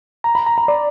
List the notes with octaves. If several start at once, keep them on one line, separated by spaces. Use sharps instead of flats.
A#5
B5
A#5
A#5
D5